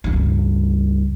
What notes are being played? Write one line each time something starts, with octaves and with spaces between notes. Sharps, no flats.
C#2 G2